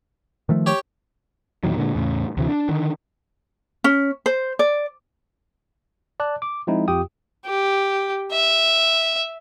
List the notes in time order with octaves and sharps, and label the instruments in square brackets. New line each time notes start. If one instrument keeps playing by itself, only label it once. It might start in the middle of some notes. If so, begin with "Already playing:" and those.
[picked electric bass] D#3 F3 A3
[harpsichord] G4 C#5 G5
[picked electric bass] E2 A#2 D#3 F#3
A#2 D3 G#3
E2 A2 C#3
D2 C3 E3
D4
D3 D#3
[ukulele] C#4
C5
D5
[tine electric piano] D5 A5 F#6
D6
F3 G#3 C4 D#4 E4
F2 F4 G4 G5 D#6
[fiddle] G4
E5